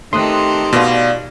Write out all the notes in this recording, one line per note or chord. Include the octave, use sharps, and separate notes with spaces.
D#3 A3 C4 G4 A4 C6 D#6 F#6
B2 F4 D5